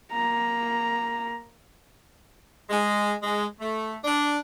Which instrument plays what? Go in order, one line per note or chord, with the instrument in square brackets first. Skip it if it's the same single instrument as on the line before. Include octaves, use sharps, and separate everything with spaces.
[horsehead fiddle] A#3 A#5
[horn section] G#3
G#3
A3
D4